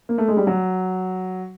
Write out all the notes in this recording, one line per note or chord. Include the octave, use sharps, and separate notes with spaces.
A#3
A3
G#3
G3
F#3